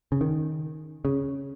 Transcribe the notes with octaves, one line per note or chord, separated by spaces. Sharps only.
C#3
D#3
C#3